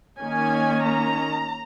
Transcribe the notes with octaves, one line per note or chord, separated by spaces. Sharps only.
D#3 A#3 C#4 G#5
A#5